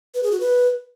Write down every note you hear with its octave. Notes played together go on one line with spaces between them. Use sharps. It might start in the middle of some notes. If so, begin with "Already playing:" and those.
B4
G#4
F#4
B4